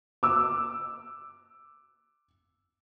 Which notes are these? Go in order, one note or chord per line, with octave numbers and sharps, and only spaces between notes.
D6 E6